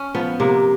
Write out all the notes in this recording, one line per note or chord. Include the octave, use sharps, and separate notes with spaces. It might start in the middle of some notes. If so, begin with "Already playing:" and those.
Already playing: C#4
F3 B3
C3 A#3